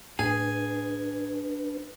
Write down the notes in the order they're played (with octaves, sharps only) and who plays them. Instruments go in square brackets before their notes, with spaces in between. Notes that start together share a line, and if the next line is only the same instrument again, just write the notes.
[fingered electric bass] A2 [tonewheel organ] D4 B4 [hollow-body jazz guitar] G#4 [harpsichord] G#5